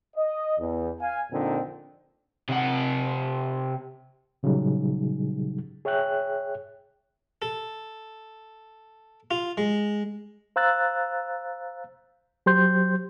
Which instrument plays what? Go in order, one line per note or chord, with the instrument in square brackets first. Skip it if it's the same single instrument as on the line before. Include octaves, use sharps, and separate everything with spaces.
[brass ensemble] D#5
E2
F5 G#5
F2 A#2 D3 C4 D#4
[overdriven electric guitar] C3 F#5
[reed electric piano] A#2 C#3 F#3 G3 D#4 G#4
G#4 C#5 E5 G5 F#6
[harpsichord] A4
F4
G#3
[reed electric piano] C5 F5 A#5 E6 F#6 A6
F#3 G4 C5 C6 G6